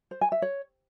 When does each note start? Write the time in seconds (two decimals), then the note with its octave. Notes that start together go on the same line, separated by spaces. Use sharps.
0.11 C5
0.21 G#5
0.32 E5
0.42 C#5